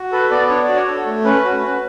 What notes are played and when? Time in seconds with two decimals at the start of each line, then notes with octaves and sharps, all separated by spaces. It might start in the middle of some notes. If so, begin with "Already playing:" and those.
Already playing: F#4
0.12 A4 B4
0.31 B3 D5
0.49 D4 C#5
0.63 D5
0.68 F#4
0.76 C#5
0.87 A4
1.06 A3
1.24 C#4 B4
1.44 F#4
1.63 C#4